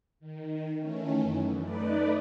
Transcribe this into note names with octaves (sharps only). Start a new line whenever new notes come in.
D#3
D#3 E3 A3 C#4
F#2
A3 D#4 B4 D5